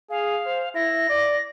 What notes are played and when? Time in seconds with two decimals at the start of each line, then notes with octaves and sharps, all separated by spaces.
0.10 G#4 F5
0.46 C5
0.75 E4 A#6
1.09 D5